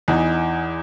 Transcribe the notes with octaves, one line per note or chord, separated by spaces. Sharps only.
E2 E3 D#4